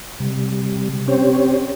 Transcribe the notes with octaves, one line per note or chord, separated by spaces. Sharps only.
C3 G3
C4 C#4 G4 C5 C#5